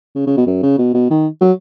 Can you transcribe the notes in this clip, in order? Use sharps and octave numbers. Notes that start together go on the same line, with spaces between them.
C#3
C#3
B2
F#2
C#3
B2
B2
D#3
F#3